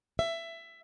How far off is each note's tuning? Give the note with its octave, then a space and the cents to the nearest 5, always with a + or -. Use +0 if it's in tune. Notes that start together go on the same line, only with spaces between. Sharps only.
E5 +15